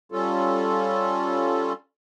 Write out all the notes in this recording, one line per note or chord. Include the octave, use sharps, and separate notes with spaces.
G3 C#4 F4 A4